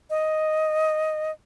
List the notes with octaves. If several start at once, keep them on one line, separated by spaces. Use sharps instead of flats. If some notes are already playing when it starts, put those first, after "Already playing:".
D#5